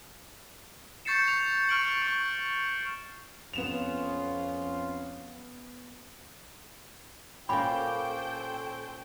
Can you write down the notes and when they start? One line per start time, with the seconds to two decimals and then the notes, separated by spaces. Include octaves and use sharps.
1.05 C#6 G6 A6 C7 C#7 E7
1.28 F7
1.69 C#6 F6 D7 F#7
2.02 C#6
3.53 F2 B3 C#4 F4 E7 F7
7.49 A#2 A#3 C#4 G4 A4 C5 G5 B5